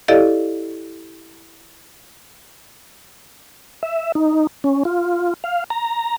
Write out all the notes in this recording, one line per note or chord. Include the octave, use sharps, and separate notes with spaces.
E4 G4 A4 D5 D#5 F5
E5
D#4
C#4
F4
F5
A#5